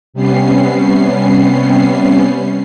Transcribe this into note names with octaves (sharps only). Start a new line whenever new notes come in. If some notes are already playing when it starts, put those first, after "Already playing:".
C3 G3 B3 C#4 C7